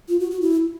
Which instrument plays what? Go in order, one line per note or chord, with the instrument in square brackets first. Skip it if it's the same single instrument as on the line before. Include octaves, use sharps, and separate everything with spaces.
[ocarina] F4
F#4
F#4
E4